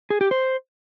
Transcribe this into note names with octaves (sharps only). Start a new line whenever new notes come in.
G#4
G4
C5